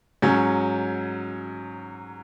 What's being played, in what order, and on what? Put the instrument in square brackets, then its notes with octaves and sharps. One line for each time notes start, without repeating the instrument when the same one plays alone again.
[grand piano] G#2 F#3 C#4